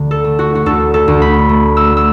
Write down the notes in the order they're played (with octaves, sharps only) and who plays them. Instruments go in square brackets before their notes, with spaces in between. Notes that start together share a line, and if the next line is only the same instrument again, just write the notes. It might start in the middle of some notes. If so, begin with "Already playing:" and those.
Already playing: [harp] D2 D3
A4
A3
F#4
F#4
D2 A4
A4
D2
B5
A3
E6
A3
E6